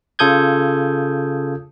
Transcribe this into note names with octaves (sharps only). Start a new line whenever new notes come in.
C#3 F4 A4 D#6 G6 G#6